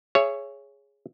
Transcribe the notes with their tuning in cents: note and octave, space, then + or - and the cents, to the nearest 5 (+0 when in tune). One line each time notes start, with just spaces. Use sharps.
G#4 +0 C#5 +0 E5 +35